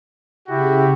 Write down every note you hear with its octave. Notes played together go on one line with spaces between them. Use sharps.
C#3 E4 F#4 G4